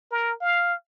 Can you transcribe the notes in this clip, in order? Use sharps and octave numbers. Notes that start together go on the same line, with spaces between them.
A#4
F5